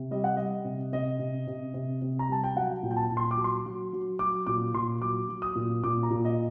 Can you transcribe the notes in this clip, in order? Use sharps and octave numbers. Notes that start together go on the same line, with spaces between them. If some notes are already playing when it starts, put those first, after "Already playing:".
Already playing: C3
G3 D#5
F#5
G3 D#5
C3
C3 D#5
C3
C3
C3
C3
A#5
G3 A5
G5
F#3 F#5
A#2
G5
A5
A#2
C6
D6
F#3
C6
F#3
F#3
F#3 D6
A#2 D6
A#2 C6
F#3 D6
F#3
D#6
A#2
A#2 D6
A#5
A#2
D#5